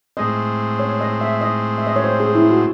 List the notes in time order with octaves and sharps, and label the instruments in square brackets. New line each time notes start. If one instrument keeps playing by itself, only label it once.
[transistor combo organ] A2 G#3 C4 [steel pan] D#5
[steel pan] C#5
D#5
E5
D#5
E5
D#5
C#5
C5
G#4
E4
F#4